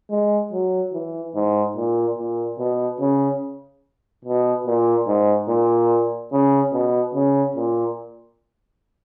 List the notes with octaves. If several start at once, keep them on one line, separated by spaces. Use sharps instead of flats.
G#3
F#3
E3
G#2
A#2
A#2
B2
C#3
B2
A#2
G#2
A#2
C#3
B2
C#3
A#2